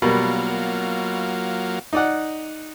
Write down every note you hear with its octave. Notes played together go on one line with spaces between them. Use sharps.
B2 F#3 G3 A#3 F4 A#4
D#4 D5 F#5